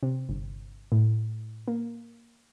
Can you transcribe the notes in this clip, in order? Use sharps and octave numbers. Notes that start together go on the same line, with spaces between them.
C3
G1
A2
A#3